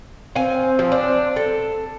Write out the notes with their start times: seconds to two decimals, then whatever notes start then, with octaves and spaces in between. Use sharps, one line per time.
0.35 C4 F5 G#5
0.79 F3
0.92 D4
1.36 A4